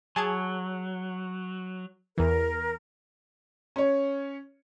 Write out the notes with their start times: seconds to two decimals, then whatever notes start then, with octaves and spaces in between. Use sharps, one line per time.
0.16 F#3 G#4 A5 G#6
2.18 E2 E3 A#4
3.76 C#4 C#5